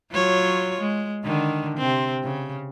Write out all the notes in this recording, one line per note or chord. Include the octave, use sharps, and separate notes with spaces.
F#3 F4 C#5
G#3
D3 D#3
C3 C4
C#3